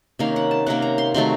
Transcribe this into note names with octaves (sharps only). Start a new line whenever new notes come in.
C3 D#3 A#3 C#4 F5
F#5
A5
C3 D#3 A#3 C#4 F#5
A#5
C6
C3 D#3 F#3 A3 C6